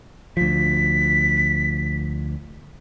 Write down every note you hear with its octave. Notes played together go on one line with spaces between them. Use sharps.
D2 F3 B6